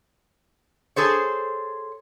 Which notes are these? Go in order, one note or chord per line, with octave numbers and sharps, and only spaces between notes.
G#4 A4 C5 C#5